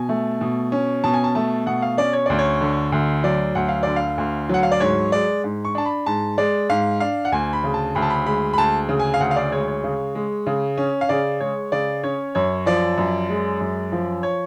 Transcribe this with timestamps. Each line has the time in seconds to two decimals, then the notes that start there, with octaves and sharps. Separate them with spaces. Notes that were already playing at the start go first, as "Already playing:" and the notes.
Already playing: B2 G#5
0.09 A3
0.41 B2
0.72 C#4
1.04 B2 A5
1.14 G#5
1.24 A5
1.35 A3 A5
1.66 B2 F#5
1.82 F5
1.97 C#4 D5
2.13 C#5
2.26 D2 D5
2.39 C#5
2.61 D3
2.92 D2
3.24 F#3 D5
3.55 D2 F#5
3.69 F5
3.83 D3 D5
3.96 F5
4.18 D2
4.49 F#3 F#5
4.63 F5
4.72 D5
4.80 G#2 C#5
5.12 G#3 D5
5.44 G#2
5.65 C#6
5.75 D4 A5
5.86 B5
6.06 G#2 A5
6.38 G#3 D5
6.69 G#2 F5
7.00 D4 F5
7.25 F#5
7.32 D2 G#5
7.53 B5
7.64 C#3
7.74 A5
7.95 D2 B5
8.02 A5
8.10 B5
8.26 G#3 B5
8.54 B5
8.58 D2 A5
8.89 C#3
9.00 G#5
9.14 F5
9.20 D2 F#5
9.31 F5
9.36 D5
9.52 G#3 C#5
9.68 C#5
9.84 C#3
10.15 G#3
10.47 C#3
10.78 C#4
11.01 F5
11.09 C#3 D5
11.40 G#3 C#5
11.72 C#3 D5
12.03 C#4 C#5
12.35 F#2 C#5
12.66 F3 D5
12.98 F#2
13.29 G#3
13.60 F#2
13.92 F3
14.23 C#5